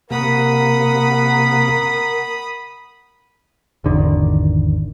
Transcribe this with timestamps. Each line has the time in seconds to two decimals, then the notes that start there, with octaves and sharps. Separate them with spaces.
0.10 C3 A#3 A#4 F#5 B5 D#6
3.84 G#1 E2 D3 D#3